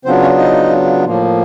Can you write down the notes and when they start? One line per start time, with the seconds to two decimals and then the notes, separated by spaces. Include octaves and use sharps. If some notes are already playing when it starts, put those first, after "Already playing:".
0.05 C#3 F#3 B3 C4 D4 F4 C5
0.21 C#4 C#5
0.38 D#4 D#5
1.05 A2 F3 A#3